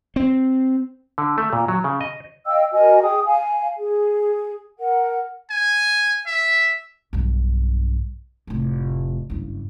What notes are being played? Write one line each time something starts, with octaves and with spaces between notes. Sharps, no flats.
C4
D3
A3
A#2
F#3
C#3
D#5
D#5 F5 G5 E6
F#4 A#4 D#5 G#5
G#4 G5 D#6
F5 G#5
G#4
A#4 F#5
G#5
E5
B1 G2
F1 A2
F#1 G2